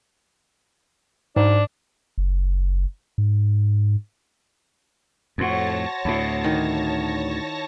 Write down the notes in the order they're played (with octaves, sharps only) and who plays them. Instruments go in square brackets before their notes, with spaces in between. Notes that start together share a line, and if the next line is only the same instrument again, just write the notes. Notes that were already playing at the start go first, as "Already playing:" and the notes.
[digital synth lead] G#2 [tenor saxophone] D4
[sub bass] F#1
G#2
[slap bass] F2 A2 [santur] F#4 C5 E6 [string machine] C#5 A5 A#6
[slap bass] D2 A2 [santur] D4 E4
[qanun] D#3